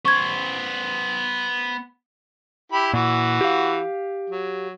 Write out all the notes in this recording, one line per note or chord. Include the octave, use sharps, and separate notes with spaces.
B3 C5 C#6 G#6
E4 G4 B5
A#2 E3 F#4
G4 F5
F#3